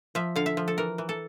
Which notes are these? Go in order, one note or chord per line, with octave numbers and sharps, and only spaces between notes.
F3 E5
D3 F5
E5
F3
A4
E3 A#4
E3
A4